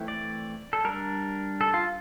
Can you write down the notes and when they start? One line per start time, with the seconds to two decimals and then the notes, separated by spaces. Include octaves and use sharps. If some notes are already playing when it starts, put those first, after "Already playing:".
Already playing: E3 A3 C4 E4
0.08 D5
0.73 A4
0.85 G3 D4 A#4
1.61 A4
1.74 F4